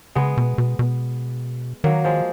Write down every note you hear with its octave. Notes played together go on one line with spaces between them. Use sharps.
C#3 G#3 B3
B2
B2
B2
D#3 F#3 A#3
F3 G#3